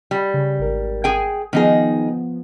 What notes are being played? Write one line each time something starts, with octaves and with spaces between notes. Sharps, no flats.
G3
C#3
G#1 A#4
G#4 G5
D#3 F3 B3 D#4 G#4